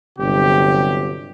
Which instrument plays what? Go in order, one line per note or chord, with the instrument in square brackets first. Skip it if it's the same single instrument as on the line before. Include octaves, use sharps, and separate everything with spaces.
[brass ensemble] G1 C3 F#3 G4